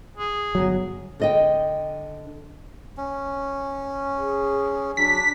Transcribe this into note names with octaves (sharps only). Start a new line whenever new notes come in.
G#4
G1 F#3
D3 D#5 G5
C#4
G#4
F#3 D4 B6